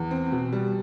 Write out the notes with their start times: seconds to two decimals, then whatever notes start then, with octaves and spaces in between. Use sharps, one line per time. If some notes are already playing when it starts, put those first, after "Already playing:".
Already playing: E2
0.11 C4
0.32 B2
0.53 G3